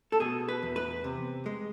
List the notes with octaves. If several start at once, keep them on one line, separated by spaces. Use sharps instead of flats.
A4
B2 G#4
B4
E2
B4
C3
G#3